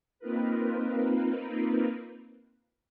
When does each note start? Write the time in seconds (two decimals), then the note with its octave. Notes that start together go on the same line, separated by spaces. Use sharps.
0.19 A#3 C4 D#4 F4 A#4 B4